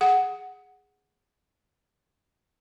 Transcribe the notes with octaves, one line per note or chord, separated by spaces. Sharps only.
G#4 F#5